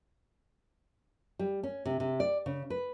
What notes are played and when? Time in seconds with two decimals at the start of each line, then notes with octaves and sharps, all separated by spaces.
1.39 G3
1.63 C#4
1.85 C3
2.00 C3
2.20 D5
2.46 C#3
2.70 B4